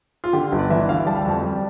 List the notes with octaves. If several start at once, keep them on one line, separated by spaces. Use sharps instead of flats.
F4
D3 G4
G1
D5
E3 E5
D2 F5
G3 A5
G5
F2 A5
G3